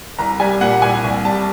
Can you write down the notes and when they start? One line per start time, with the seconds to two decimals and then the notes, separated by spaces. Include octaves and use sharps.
0.19 C2 A#5
0.39 G3 G#5
0.61 A#2 F#5
0.82 C2 G#5
1.04 C2
1.25 G3 A5